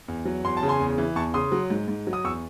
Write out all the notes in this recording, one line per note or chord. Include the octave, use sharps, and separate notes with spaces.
E2
F#3
E2 C6
A5
C#3
G#5 C6
E2
E3
E2 A5 C#6
C#3 C6 D#6
F#3
G#2
G#2
F#3
D#6
E2 C#6 E6